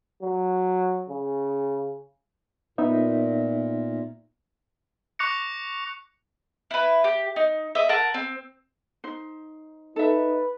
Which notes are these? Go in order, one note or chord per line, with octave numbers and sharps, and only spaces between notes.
F#3
C#3
A#2 B3 D#4 E5
C#6 D6 F#6 A#6 C#7
E4 B4
G4
D#4
D#5 E5
A#4 F#5 A5
C4
D#4 C5
D#4 A4 B4 E5